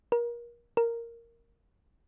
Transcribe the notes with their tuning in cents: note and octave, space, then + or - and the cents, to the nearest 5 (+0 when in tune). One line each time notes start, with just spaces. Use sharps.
A#4 +30
A#4 -5